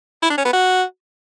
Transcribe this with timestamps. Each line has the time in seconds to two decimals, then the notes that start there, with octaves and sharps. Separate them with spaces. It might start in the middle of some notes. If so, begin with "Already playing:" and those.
0.22 E4
0.30 D4
0.38 C#4
0.45 B3
0.53 F#4